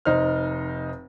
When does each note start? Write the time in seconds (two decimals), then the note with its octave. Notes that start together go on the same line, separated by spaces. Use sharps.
0.05 F1 D#4 C5 F6